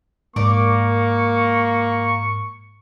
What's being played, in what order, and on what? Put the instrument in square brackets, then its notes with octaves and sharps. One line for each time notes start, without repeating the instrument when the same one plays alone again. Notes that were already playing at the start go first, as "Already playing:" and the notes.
[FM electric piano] G#2 [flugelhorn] A#3 [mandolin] A#4 D5 D6 [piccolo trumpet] C#6